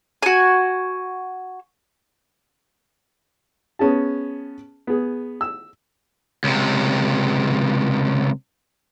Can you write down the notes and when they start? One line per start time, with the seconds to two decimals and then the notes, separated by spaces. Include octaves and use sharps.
0.23 F#4 G#5
3.79 B3 C#4 G#4 A5
4.87 B3 G#4
5.41 E6
6.44 C#2 C3